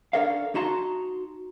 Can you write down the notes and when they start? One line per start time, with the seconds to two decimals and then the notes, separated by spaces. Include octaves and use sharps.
0.13 D4 A4 A#4 C#5 F5
0.55 D#4 F#4 A5 A#5 C6